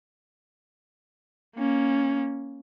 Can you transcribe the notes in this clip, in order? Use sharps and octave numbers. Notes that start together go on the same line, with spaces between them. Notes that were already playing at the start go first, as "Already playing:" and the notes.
A#3 C#4